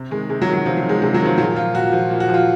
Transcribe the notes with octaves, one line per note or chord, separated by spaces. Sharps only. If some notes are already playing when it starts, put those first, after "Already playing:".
Already playing: C3
D#3 G#3
C3 G#3
F#3
D#3
F#3
C3 F3
F#3
D#3
G#3
C3 G#3
F#3
D#3
F3
A#2 F#3
F3 F4
A#2 F#4
F3
A#2
F#4
F3
F4